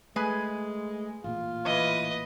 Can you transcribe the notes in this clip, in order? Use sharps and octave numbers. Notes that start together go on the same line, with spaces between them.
G#3 A3 G#4 B4 G#5
A1 A#2 A#3 F4
E3 B4 D#5